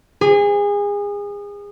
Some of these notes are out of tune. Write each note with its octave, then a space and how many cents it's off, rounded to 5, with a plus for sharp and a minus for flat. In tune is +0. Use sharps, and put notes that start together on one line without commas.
G#4 -30